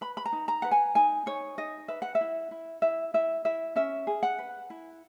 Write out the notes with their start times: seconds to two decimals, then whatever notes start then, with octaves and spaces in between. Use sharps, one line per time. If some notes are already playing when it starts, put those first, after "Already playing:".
0.01 B4 B5
0.17 B5
0.26 A#5
0.33 D#4
0.48 A#5
0.62 B4 F#5
0.71 G#5
0.95 D#4 G#5
1.26 D#4 C#5
1.58 D#4 D#5
1.88 B4 E5
2.02 F#5
2.15 E5
2.21 E4
2.51 E4
2.82 E4 E5
3.14 E4 E5
3.45 E4 E5
3.76 C#4 E5
4.07 G#4
4.23 F#5
4.38 B4
4.70 E4